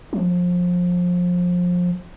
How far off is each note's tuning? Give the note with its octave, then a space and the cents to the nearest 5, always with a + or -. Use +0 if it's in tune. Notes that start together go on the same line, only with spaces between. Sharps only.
F3 +25